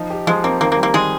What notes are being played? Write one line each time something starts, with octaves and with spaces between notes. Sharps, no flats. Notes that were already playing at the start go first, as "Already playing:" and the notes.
Already playing: F3 D#4
G4
F3 G#3
A#3 C4
D#3 A#3
A#3
G3
A#3
D#3 G#3 G#4